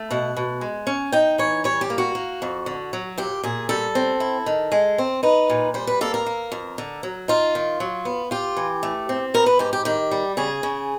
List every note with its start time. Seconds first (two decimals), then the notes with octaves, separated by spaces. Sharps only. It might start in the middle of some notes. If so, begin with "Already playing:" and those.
Already playing: A3
0.11 B2 F#5
0.36 B2
0.61 G#3
0.87 C#4
1.12 D#4 G5
1.38 E3 C#5
1.64 G3 C#5
1.81 G4
1.90 A#3
1.98 F#4
2.15 A#3
2.42 F2
2.66 D3
2.93 F#3
3.18 A#2 G4
3.43 A#2 G#4
3.69 G3 A4
3.95 C4
4.20 E4
4.46 D#3
4.72 G#3
4.98 C4
5.23 D#4 B4
5.50 A#2
5.74 G3 C5
5.87 B4
6.01 A#3 A4
6.14 A#4
6.26 A#3
6.52 F2
6.78 D3
7.03 F#3
7.28 D#4 F4
7.55 D#3
7.80 F#3
8.05 B3
8.31 F4 G4
8.57 E3
8.83 A3
9.09 C4
9.34 B3 A#4
9.46 B4
9.59 G#2 G4
9.73 G4
9.85 D#3 G4
10.11 G3
10.37 C#3 G#4
10.63 C#3